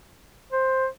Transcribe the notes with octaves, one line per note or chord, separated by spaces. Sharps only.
C5